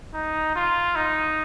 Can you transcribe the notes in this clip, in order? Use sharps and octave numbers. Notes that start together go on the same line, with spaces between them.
D#4
F4
D#4